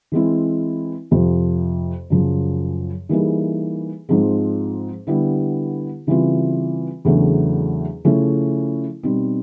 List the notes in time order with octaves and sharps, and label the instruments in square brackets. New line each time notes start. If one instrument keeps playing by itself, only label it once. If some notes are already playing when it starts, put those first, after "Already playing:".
[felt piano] E3 G#3 C4 E4
F2 C3 F3
F#2 C#3 F3
E3 G3 A#3 D#4 G#4
G#2 F3 G#3 C4
D3 G3 B3 E4 G4
C#3 E3 G3 C4 F4
E2 C#3 F#3 A3 D4
C#3 F3 A3 C#4 E4
B2 G3 C4 D#4